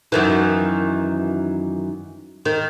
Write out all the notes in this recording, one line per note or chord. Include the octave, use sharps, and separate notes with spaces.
F#2 D#3 E3
D#3